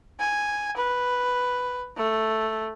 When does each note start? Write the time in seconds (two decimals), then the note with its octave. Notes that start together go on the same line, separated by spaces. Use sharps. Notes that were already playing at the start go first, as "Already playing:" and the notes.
0.20 G#5
0.77 B4
1.98 A3